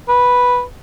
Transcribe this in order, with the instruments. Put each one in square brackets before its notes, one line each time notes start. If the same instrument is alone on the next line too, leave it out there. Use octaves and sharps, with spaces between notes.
[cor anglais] B4